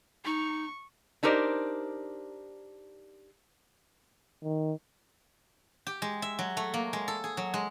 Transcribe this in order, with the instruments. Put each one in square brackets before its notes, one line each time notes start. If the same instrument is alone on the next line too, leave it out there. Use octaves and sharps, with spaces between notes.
[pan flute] D#4 [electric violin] C#6
[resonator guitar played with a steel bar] D4 D#4 G4 A#4 C5 D5
[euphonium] D#3
[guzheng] G4
G#3
E5
F#3
A3
A#3
G#3
A4
G#4
F#3
G#3